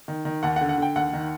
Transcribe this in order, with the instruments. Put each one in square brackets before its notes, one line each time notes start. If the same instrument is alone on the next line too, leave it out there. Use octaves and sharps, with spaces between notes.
[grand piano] D#3
D#3
D#2 F#5
F#5
D3
F#5
D3 G5
D#2 F#5
D#3